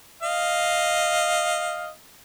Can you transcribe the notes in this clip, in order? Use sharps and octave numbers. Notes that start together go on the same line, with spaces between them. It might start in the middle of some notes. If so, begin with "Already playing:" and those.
D#5 F5